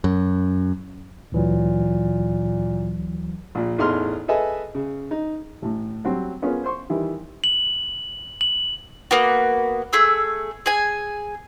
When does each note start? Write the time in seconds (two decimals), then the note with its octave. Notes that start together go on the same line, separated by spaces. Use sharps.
0.04 F#2
1.32 D2 A#2 E3 F#3
3.55 A#1 A#2
3.78 A1 E2 D#4 G#4 C6 F6
4.28 G#4 A4 B4 D#5 E5 G#5
4.75 C#3
5.11 D#4
5.62 A1 A2
6.05 F#3 G3 C4
6.42 B3 C#4 F4 G#4 A#4
6.64 C5 C6 C#6
6.90 D#3 E3 G3
7.44 F#7
8.41 F#7
9.11 A#3 B3 F#4
9.93 A3 G#4 E6
10.66 G#4 G#5